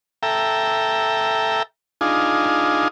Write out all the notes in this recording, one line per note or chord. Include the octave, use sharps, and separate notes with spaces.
A4 E5 G5 A#5
D4 D#4 F4 G#4